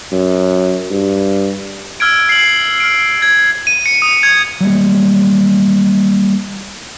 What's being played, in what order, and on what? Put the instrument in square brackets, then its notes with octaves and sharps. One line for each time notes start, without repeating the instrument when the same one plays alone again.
[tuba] F#2
G2
[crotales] E6 F6 G#6 D7
C7 F#7
F6 D7
G#6
D#7
C#7
D#6
G#6
[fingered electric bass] F#3 G3 A#3